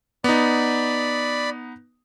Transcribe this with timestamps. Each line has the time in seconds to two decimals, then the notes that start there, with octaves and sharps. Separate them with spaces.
0.24 B3 D#4 D5 B5